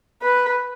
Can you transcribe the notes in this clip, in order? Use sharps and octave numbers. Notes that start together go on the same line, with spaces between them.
B4